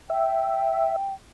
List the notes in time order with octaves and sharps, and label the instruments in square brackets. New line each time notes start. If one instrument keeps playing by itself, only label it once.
[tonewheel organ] E5 [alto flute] G5